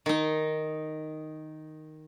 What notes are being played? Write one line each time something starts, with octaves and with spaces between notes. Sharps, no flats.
D#3 D#4